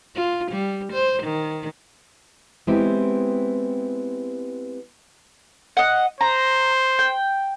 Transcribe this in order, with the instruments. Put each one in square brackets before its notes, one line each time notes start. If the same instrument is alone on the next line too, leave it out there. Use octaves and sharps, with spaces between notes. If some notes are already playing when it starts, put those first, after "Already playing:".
[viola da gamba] F4
G3
C5
D#3
[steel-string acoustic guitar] G#3 B3 C4 E4 G4
[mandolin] D#5 F#5
[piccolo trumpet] C5 [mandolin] A#5
[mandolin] G5